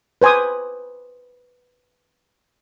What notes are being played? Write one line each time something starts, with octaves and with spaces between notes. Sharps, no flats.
B4 C5 G#5 D6 D#6